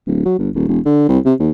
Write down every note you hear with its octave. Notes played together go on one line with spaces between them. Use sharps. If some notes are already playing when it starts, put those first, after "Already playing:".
D1
F#3
G1
D#1
E1
D3
C2
C3
D#2